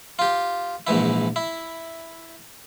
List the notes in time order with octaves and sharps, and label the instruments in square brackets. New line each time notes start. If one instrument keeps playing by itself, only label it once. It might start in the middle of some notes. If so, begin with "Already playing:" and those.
[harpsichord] F4 G4
A#1 G#2 E3 E4
E4